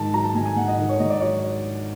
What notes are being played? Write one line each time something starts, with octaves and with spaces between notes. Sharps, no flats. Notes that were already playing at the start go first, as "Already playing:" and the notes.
Already playing: G#2 D#3 A5
F#3 A#5
A5
G#2 G#5
G#5
G#2 F#5
D#5
D#3
C#5
G#2 D#5
D5
F#3 C#5